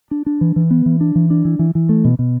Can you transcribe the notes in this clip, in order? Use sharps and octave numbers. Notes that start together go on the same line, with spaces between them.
D4
D4
E3
E3
B3
E3
D4
E3
D4
E3
E3
E3
A3
B2
B2